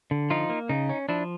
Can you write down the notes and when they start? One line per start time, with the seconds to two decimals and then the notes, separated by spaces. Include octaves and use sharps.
0.11 D3
0.30 F3 D#4 F4
0.50 A#3
0.69 C#3 D#4
0.89 C#4
1.09 F3 D4 E4